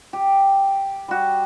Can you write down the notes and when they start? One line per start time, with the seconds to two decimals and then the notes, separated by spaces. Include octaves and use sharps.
0.13 G4
1.08 G3 F#4